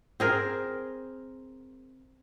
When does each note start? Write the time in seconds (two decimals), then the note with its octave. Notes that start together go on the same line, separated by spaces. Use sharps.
0.20 C4 G#4 A#4